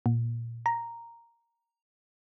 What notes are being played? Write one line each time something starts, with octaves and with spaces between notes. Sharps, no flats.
A#2
A#5